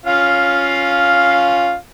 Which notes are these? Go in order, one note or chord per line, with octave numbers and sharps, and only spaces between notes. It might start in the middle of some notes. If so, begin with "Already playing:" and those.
C#4 F4 F5